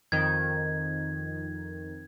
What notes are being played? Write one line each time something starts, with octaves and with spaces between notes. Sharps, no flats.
F2 D#3 G#6